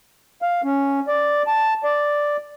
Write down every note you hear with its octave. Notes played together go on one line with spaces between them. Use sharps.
F5
C#4
D5
A5
D5